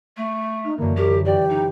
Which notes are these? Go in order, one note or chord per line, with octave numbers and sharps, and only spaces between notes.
A3
D#4 F6
F#2 D3 E3 A#3
C#4 G4 A#4
E3 G4 D5
D#4